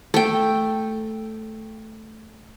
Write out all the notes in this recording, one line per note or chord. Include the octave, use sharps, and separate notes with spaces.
A3 G5